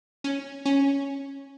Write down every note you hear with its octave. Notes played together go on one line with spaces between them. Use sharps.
C#4
C#4